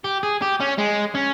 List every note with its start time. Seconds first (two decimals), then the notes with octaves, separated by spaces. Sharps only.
0.04 G4
0.23 G#4
0.42 G4
0.60 C#4
0.78 G#3
1.15 C#4